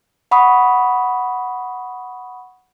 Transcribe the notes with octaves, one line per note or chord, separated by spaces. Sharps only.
F#5 B5 C#6 D#6